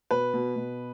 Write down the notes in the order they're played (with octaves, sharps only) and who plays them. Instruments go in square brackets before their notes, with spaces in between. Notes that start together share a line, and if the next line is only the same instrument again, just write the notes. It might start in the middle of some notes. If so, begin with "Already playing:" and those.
[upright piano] B2 B4
B2
B2